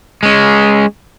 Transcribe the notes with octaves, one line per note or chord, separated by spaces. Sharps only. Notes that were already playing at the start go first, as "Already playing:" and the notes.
G#3 C#4